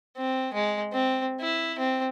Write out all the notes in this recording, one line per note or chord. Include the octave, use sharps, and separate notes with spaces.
C4
G#3
C4
E4
C4